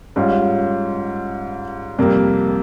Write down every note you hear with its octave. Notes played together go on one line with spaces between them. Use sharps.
G#2 G3 C#4 F4
F2 C3 G3 A#3